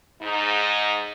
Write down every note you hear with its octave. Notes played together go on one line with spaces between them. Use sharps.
G#2 D#4